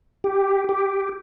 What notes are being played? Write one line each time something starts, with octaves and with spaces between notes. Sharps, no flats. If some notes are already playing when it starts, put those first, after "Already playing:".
G4
G4